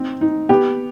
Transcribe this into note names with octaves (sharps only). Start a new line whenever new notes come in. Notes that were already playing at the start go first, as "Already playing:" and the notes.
Already playing: C4 D#4
D#4
B3 G4